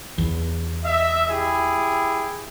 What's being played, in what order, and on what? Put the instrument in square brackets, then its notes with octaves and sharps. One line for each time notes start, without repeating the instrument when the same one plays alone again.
[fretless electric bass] E2
[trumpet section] D#5 E5
E4 G4 G#4